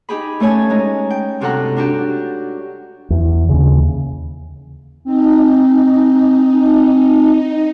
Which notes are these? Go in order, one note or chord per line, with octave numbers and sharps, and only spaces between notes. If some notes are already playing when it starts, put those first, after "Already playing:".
D#4 G4 G#4 B5
A3 C#4 C#5 G#5 A5
G#3 D#4 A#5
G5
G2 C3 F#4 A4 F#5 A#5
D4 F#4 G4
E2
D#2 C#3
C4 D#4